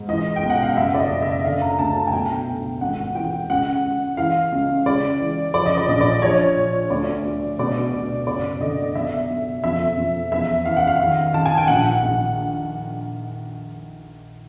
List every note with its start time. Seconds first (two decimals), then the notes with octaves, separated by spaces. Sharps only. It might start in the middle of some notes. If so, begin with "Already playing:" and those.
Already playing: G#2
0.08 E3 D#5
0.36 G5
0.43 B1
0.50 F#5
0.63 F5
0.77 F#1 E5
0.94 D5
0.99 D#5
1.11 F#1
1.22 E5
1.45 D3 F5
1.62 A#5
1.79 D2 A5
2.07 G#5
2.13 B1 G5
2.47 B1
2.81 G#1 F#5
3.15 E3 G5
3.49 C#2 F#5
3.84 C#3
4.17 E3 F5
4.52 C#2
4.86 C#3 D5
5.20 E3
5.54 F3 D5
5.66 D#5
5.77 D5
5.88 A#1 D#5
6.01 D5
6.22 F3 C#5
6.56 A#2
6.90 D2 D5
7.25 D2
7.59 B2 D5
7.93 B2
8.27 F#1 D5
8.61 D3 D#5
8.95 B1 E5
9.29 B1
9.64 F2 E5
9.97 F2
10.32 E2 E5
10.65 E3 F5
10.77 F#5
10.87 F5
11.00 D#3
11.34 D#3 A5
11.46 G#5
11.57 G5
11.68 A#1 F#5
12.02 A#1